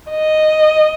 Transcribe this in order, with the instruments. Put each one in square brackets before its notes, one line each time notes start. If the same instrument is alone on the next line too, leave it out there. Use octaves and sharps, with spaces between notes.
[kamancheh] D#5